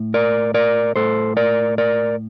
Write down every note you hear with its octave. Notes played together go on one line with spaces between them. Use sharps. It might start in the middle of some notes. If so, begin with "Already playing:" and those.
Already playing: A2
A#4 D5
A#4 D5
A2 A4 C5
A#4 D5
A#4 D5